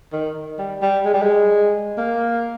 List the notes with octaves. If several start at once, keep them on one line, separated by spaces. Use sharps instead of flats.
D#3
G3
G3
G#3
G3
G#3
A#3